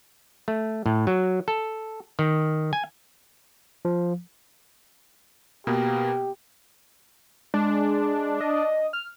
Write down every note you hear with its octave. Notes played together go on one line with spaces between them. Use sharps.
A3
A2
F#3
A4
D#3
G#5
F3
B2 A#3 B3 G4
G#3 D4
D#5
F6